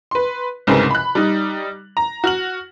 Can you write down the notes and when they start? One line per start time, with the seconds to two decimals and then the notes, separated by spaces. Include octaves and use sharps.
0.11 B4 C6
0.67 C2 G#2 C#3 C4 A#4 B4
0.91 B5 F#6
1.15 G3 D#4
1.97 A#5
2.24 F#4 F6 F#7